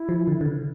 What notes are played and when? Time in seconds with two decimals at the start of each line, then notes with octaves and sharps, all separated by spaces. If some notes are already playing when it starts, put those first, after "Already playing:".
Already playing: E4
0.09 F3
0.27 D3
0.41 D3
0.46 C#3